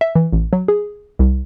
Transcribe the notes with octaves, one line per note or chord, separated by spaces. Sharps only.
E5
E3
A1
F#3
G#4
C2